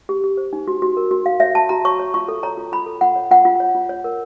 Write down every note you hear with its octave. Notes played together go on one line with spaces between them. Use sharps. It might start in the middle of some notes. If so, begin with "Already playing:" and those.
G4
G4
C5
D#4
F#4
F#4
A#4
F#4
F#4 F5
C#5 E5
F#4 A5
F#4 A#5
C#5 C#6
C#5
F4 C#6
A4
C#5 A#5
F4
F4 B5
A4
F4 F#5
C#5
F4 F#5
F4
C#5
F4
C#5
A#4